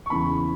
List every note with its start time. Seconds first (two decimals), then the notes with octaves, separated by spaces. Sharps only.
0.06 C#6
0.10 E2 C#3 E3 B5